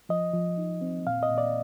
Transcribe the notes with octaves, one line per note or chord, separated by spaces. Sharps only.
F3 D#5
F3
D#4
C4
A#2 F5
D#5
A#2
D5